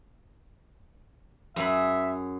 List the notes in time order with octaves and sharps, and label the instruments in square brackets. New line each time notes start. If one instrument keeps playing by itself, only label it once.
[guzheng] F#2 G#4 B5 [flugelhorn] E5